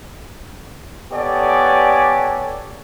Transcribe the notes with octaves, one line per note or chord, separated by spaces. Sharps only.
B3 G4 A4 C#5 D5 G#5